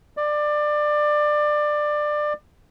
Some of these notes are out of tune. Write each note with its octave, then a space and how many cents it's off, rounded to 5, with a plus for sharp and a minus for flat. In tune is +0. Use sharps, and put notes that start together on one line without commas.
D5 +20